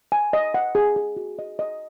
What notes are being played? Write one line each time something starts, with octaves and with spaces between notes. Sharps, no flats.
G#5
D#5
F#5
G#4
G#4
F#4
D#5
D#5